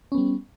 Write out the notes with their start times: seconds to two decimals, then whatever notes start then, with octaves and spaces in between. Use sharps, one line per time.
0.12 C#4
0.15 B3
0.18 G3